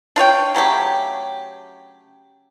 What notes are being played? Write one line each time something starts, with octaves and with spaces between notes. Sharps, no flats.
D4 F4 C#5 G5
C#3 F#3 A3 G4